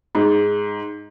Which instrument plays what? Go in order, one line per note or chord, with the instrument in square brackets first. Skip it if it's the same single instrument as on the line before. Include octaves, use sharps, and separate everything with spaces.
[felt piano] G#2